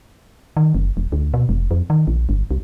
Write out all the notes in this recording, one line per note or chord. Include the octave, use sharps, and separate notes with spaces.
D#3
F#1
E1
D2
B2
F1
F2
D#3
A#1
G1
C2